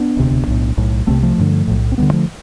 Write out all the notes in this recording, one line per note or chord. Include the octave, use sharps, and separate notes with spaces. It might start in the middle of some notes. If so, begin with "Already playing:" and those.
Already playing: B3 D4
E1 D2 C3
B1 A2
B1 A2
C2 C3 A3 C4
F3 A3
A1 G2 D3
B1 A2
C4
D2 D3 G3 B3
F3 A3